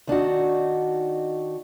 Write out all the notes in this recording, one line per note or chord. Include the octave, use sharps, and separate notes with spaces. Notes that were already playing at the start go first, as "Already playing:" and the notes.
D#3 D4 D#4 F#4